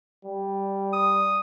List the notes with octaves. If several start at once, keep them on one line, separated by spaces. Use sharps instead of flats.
G3
D#6